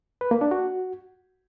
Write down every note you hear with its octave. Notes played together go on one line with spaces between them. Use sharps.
B4
A#3
D4
F#4